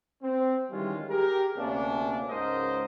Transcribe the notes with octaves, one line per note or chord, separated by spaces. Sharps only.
C4
D#3 E3 G3 G#3 C#4 F4
G4 G#4 A#4
D2 C3 A#3 C#4 D4
C#2 G#2 G#3 A#4 C5 D#5